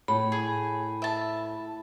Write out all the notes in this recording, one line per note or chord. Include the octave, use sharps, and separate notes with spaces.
A2 B5
G#4
E5 A5